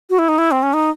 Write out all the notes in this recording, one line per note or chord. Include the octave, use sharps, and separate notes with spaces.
F#4
E4
D#4
E4
C4
C#4
D#4